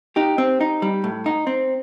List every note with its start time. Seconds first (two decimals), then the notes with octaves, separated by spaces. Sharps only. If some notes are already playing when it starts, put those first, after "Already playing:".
0.16 D#4 G4
0.38 C4
0.61 D#4
0.82 G3
1.04 A2
1.26 D#4
1.47 C4